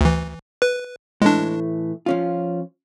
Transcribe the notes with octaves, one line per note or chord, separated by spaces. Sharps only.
D2 E3
B4
A2 E3 G#3 A3 D4
F3 C#4 F4